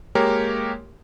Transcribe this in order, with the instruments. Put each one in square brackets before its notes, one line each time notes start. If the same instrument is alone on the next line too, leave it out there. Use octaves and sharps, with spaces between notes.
[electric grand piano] G#3 A#3 G4 A#4 C#5